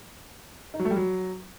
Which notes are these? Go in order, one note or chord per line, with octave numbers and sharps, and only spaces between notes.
D#4
F#3
A3
G3
F#3